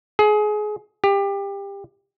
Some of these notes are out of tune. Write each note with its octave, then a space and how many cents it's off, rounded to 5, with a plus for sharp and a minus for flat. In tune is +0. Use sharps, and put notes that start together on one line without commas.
G#4 +25
G4 +25